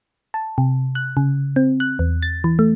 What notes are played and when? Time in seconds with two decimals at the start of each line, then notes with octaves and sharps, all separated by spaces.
0.34 A5
0.58 C3
0.95 F#6
1.17 C#3
1.56 C4
1.80 F#6
1.99 E2
2.23 A6
2.44 E3
2.59 A3